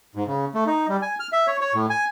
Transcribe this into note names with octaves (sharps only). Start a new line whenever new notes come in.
G#2
C#3
A3
D#4
G3
G#5
F6
E5
C#5
C#5
A2
G#5